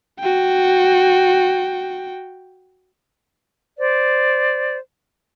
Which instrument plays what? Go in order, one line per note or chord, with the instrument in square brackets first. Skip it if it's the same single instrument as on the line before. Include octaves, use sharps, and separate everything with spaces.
[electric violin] F#4 G5
[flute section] C5 D5